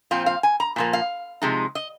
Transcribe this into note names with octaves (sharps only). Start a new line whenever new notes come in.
A#2 F3 C4 F4
F5
G#5
A#5
A#2 F3 A#3
F5
C3 F3 G#3 D#4
D#5